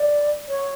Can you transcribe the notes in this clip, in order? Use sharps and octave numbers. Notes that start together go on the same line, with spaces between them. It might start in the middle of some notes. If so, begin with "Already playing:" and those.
Already playing: D5
C#5